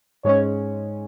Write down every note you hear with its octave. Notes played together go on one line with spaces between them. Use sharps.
G#2 G#3 C#4 C#5